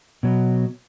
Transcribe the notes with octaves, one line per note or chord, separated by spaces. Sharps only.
B2 F#3